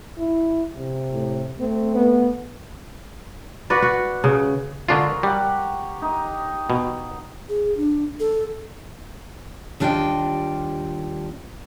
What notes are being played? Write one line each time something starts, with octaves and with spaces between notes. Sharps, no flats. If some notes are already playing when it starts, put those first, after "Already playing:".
E4
C3
A2
A3 C4
B3
F#4 B4 D5
F#4
C#3
D3 G#3 D4 F4 A#4 C#5
G3 G4 F#5
D#4 D#5
B2
G#4
D4
A4
D#2 G3 D4 F4 D#5 G5